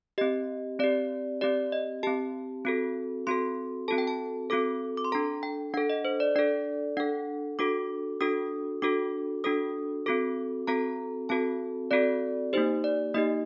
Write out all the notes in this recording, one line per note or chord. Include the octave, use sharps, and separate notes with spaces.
C4 G4 D#5
C4 G4 D5
C4 G4 D5
D#5
C4 G4 A5
C4 F#4 A4
C4 F#4 A4 C6
C4 F#4 A4 A5
G5
A5
C4 F#4 A4 D6
D6
C6
D4 A4 A#5
G5
D4 A4 F#5
D#5
C5
D5
D4 A4 D5
D4 A4 F#5
D4 F#4 A4 D6
D4 F#4 A4 D#6
D4 F#4 A4 D6
D4 F#4 A4 D#6
C4 F#4 A4 D6
C4 F#4 A4 A#5
C4 F#4 A4 A5
C4 F#4 A4 D5
A#3 D#4 G4 C5
D5
A#3 D#4 G4 D#5